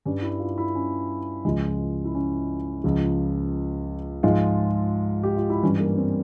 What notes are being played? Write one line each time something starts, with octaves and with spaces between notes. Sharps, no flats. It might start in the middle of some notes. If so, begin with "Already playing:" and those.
G2 G3 C#4
E4
F4
E4
C#4
C#2 C#3 F3 G#3
E4
C#4
C#2 C#3 F3
G#2 F3 G#3 F4
G4
F4
E4
G2 E3 G3 C#4
A#3
C4